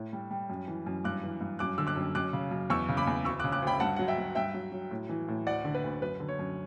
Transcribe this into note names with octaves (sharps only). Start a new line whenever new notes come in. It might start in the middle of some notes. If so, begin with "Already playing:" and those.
Already playing: A2
G3
G3
F#2
E3
F#2
G2 D6 F#6
E3
G2
F#2 D6 F#6
D3 E6
D6 F#6
F#2
F#2 D6 F#6
C#3
F#2
E2 C#6 E6
C#3
B5 D6
E2
D2 C#6 E6
D6 F#6
C#3
D6 F#6
D2 G5 B5
G2 F#5 A5
F#3 F#5
E5 G5
F#3
G2 E5 G5
F#3
F#3
A2
E3
A2
D2 D5 F#5
D3
B4
D2
F#2 B4
D3
C#5
F#2